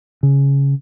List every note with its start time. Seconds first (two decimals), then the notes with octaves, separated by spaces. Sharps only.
0.23 C#3